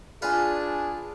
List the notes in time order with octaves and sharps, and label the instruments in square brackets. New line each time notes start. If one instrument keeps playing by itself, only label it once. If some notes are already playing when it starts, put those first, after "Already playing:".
[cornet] D4 [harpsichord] F4 B4 [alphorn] G#4 [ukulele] D5 G#5